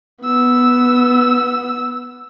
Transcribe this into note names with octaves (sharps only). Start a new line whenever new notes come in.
B3 E6